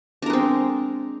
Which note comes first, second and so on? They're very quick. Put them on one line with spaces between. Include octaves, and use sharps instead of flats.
D4 A#4 G#3 C4